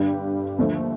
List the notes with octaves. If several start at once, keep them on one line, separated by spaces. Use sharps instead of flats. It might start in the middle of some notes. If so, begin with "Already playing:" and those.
Already playing: G2 D3 G3 D4 G4
D#2 D3 F3 A3